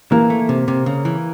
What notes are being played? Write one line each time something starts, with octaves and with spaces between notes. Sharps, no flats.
E3 A#3
A3
C3
C3
C#3
E3